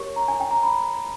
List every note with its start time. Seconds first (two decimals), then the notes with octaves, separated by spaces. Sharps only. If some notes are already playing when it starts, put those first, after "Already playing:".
Already playing: G4 A#4 C#5 C#6
0.16 A#5
0.28 G#5
0.40 G5
0.51 A#5
0.63 B5